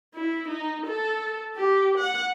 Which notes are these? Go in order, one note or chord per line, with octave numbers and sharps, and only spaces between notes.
E4
D#4
A4
G4
F#5